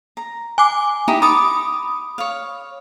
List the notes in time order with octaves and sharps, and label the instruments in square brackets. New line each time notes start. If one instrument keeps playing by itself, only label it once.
[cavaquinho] A#5
[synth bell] G#5 D6
[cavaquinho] D#4 E4 G4
[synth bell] B5 D#6 [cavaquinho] D6
[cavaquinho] C#5 F5